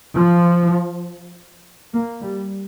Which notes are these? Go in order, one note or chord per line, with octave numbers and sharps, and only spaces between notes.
F3
A#3
G3